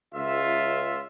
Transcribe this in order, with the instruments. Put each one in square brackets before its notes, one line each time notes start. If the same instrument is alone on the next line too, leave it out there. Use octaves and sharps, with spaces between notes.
[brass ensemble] C#2 E5 [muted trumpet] F4